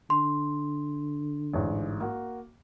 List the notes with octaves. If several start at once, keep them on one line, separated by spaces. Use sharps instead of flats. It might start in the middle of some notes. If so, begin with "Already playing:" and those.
D3 C6
A1 G#2 D5
A#3 F#4